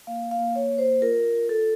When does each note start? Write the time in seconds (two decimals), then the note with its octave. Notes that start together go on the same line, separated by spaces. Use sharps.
0.07 A#3 F5
0.31 F5
0.39 A#3
0.56 C#5
0.71 A#3
0.78 C5
1.02 F4 A#4
1.34 F4
1.49 A4